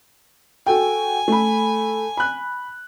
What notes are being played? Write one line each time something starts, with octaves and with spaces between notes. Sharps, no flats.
F#4 A4 G5 G#5
A3 B5
B5 F#6